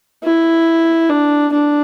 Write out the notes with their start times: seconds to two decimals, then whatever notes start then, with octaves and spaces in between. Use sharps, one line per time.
0.24 E4
1.10 D4
1.53 D4